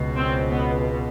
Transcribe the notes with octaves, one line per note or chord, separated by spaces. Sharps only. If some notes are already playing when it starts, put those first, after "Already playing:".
Already playing: C#2 B2
C4
B3